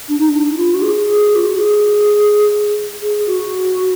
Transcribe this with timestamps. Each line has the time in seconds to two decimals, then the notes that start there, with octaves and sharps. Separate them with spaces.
0.09 D4
0.19 D#4
0.28 D4
0.52 D#4
0.57 F4
0.74 F#4
0.82 G#4
1.35 F4
1.45 F#4
1.55 G#4
3.02 G#4
3.26 F#4